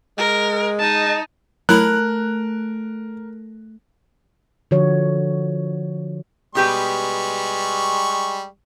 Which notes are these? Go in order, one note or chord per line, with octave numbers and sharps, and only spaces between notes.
G#3 A#4
D#4 D#5 A5
F#3 A3 E4 A#4 B5 F#6
D3 F3 F#4 C#5
B2 G3 G#3 G4 B4 C#6